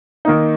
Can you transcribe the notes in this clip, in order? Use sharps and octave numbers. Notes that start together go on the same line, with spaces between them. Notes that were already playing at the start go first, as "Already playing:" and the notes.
D#3 A#3 D#4